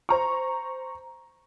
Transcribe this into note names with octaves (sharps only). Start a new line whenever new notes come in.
C5 A#5 C#6